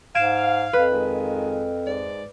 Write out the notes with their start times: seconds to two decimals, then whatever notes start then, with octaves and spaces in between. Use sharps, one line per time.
0.15 G#2 F5 G#6 D7 E7
0.73 F2 B4
0.93 D#3 G#3 F4
1.86 G#2 D5